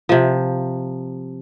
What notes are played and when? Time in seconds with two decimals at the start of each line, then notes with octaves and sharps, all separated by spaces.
0.09 C3 F3